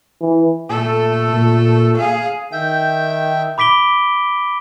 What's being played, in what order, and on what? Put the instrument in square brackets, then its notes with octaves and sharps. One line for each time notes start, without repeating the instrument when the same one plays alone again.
[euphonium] E3
[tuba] A#2 [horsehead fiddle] A3 A4
[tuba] A#2
[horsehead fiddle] G#4 F5
[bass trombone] D#3 [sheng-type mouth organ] E5 G5 [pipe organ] G6
[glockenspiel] B5 D6 B6 D7 G7